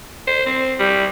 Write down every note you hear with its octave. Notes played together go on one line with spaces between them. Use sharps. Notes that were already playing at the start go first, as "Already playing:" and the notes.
C5
C4
G3